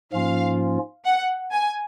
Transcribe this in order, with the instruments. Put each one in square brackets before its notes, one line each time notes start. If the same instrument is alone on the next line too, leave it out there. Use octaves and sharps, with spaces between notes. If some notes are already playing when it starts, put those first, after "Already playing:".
[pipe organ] G#2 F3 A#3 C#4 F4 [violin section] F5
[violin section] F#5
G#5